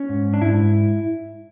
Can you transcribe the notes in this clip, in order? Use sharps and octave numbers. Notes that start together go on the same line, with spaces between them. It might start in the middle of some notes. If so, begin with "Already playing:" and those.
Already playing: C#4
G#2
D4
G#2 E4